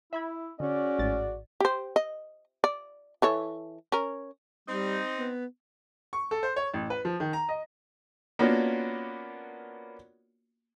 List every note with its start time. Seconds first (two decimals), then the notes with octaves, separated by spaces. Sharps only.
0.13 E4 E5 B5 G#6
0.60 D3 C#4 F#4 G#4 D5
0.99 A1 G#2 A6
1.60 G4 C5
1.96 D#5
2.64 D5
3.22 E3 A4 C#5
3.92 C#4 A#4
4.68 G3 C4 D#4
5.18 B3
6.13 C#6
6.31 A4
6.43 C5
6.56 C#5
6.74 A1
6.90 B4
7.05 F3
7.20 D#3
7.33 A#5
7.49 D#5
8.39 A#3 B3 C#4 D4 F4 F#4